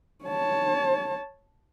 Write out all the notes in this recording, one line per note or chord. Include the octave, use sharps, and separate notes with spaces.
C#5 A5